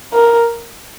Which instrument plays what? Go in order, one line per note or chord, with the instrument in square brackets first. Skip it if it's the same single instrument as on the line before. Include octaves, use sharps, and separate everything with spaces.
[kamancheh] A#4